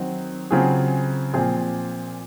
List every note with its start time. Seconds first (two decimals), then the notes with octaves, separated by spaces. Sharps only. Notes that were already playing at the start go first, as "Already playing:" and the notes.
Already playing: D#3 F#3 C4 D#4
0.51 C#3 F#3 C4 F4 G#4
1.34 A#2 F3 C4 F4 G#4